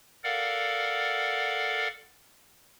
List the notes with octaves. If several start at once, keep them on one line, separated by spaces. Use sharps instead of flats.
A4 A#4 D5 F5 F#5